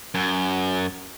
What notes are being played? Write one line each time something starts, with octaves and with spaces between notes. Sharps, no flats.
F#2